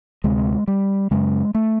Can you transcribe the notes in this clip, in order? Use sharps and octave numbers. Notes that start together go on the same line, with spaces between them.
D2 C3 G#3
G3
F#2 C#3 G#3
A3